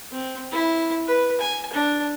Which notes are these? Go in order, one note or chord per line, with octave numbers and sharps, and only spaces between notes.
C4
E4
B4
G#5
D4